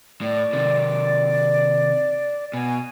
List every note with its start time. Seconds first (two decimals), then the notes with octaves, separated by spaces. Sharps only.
0.21 A2 D5
0.53 C3 D#3
2.53 B2 G#5